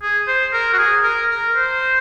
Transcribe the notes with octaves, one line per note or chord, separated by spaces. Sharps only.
G#4
C5
A#4
F#4
G#4
A#4
A#4
C5